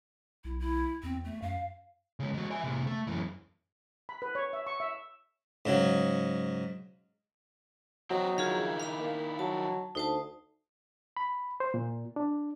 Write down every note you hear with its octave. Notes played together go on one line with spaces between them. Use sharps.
B1 E4
E4
E2 C4
A3
F#2 F5
C#3 G#3
G#3 F#4
E5 G#5
A2 C3
A3
F#2 E3
B5
B4
C#5
E5
C#6
E5
G#2 C#3 F#3
F#3 C4 D#5
D#3 E4 F4 G#4 F5
F5 B5
A#3
F#3 A5
D2 D#4 C5 A5
B5
C5
A#2
D4